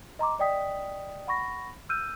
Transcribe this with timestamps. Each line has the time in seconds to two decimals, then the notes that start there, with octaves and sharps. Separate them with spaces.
0.19 D#5 A#5 C6 D6
0.39 D5 D#5 G5 D#6 B6
1.27 F#5 B5 C#6 A#6
1.89 E6 F6 G6 D#7